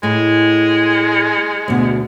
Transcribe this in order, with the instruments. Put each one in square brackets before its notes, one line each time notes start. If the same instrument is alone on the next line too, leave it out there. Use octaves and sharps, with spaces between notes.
[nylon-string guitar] A2 [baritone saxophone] G#3
[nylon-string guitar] D2 B2